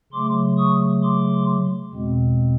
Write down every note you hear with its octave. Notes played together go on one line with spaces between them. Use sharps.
C#3 F#3 A3 C6 D6
C#6 D#6
C6 D6
E2 B2 G#3 C4